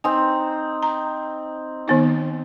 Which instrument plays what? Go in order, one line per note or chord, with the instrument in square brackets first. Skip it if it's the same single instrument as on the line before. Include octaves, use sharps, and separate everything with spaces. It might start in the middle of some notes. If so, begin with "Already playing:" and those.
[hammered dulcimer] C4 D#4 [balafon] G#5
[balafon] A#5
D#3 B3 D#4